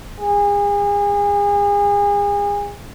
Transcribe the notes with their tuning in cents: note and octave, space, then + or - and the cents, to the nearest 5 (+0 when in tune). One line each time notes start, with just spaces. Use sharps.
G#4 -35